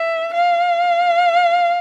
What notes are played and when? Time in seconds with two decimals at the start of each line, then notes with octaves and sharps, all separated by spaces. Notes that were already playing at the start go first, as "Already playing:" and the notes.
Already playing: E5
0.34 F5